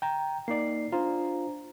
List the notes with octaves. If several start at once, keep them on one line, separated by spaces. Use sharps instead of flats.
G5 A#5
A#3 D#4 D5 C7
D4 F4 C5 A#5